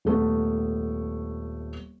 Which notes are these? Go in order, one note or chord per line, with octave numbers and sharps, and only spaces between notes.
D#1 A3 B3